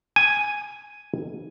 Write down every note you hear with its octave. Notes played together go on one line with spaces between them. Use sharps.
G#5